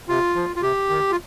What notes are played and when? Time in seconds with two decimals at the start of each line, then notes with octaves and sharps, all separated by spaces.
0.09 C3 F4
0.35 F3
0.56 F4
0.62 C3 G4
0.90 D#3
1.11 F4